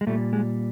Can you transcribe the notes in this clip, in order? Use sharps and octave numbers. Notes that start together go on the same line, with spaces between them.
G#3
A#2 G3 A3
G#3